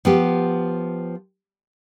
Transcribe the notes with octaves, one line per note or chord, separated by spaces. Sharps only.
F3 B3 G4